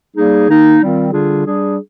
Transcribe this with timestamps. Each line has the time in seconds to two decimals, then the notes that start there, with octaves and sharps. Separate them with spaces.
0.15 G3 A#3 D#4 G#4
0.48 D#3 A#3 D#4
0.80 D#3 G3 C4 F4
1.11 D3 G3 D4 F4 G#4
1.45 G3 D4 G#4